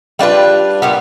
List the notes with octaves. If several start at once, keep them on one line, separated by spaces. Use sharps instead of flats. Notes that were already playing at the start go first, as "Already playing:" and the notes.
G3 D4 F4 B4
A#2 G3 B3